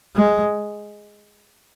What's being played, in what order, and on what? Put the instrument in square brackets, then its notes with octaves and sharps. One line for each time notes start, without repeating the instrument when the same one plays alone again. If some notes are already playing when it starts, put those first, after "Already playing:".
[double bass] G#3